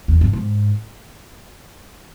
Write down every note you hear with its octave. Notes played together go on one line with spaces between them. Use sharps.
E2
G2
G#2